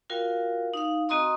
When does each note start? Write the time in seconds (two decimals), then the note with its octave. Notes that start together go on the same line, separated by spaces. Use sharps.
0.10 F4 F#4 A#4 F5 G5
0.74 D#4 F5
1.09 C4 F#4 D#5 A#5 C6 D#6